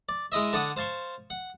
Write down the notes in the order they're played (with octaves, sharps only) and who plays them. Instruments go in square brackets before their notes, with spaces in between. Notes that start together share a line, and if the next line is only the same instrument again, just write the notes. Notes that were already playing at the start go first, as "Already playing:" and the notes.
[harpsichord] D5
G#3 E4 D#5 E5
D3 D4 D5 F#5 D#6
C5 F5 A5 C6 C#6
F#5